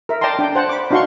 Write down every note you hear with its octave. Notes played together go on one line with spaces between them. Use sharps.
A#4 E5
D5 G5 A5 A#5 C6
D4 G5
C5 F#5 A5
B5 D6
D4 D#4 F#4 F5 C6 C#6